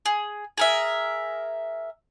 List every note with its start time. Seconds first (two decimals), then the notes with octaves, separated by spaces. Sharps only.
0.05 G#4
0.58 G#4 A#4 E5